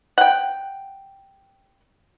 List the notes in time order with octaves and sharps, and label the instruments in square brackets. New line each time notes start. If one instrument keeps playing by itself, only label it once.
[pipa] F#5 G5